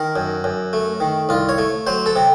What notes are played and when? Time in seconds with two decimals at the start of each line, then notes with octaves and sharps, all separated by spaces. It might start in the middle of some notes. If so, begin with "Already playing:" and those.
Already playing: D#3 A#4
0.16 F#2
0.44 F#2
0.73 A3
1.00 D#3
1.29 C2 F4
1.49 C#5
1.58 A3
1.87 F#3 C5
2.06 A4
2.16 C3